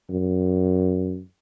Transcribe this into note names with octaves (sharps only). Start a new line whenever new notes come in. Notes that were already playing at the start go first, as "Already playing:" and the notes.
F#2